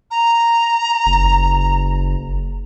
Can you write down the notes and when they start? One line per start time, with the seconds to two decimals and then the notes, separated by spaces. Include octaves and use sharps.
0.11 A#5
1.06 F#1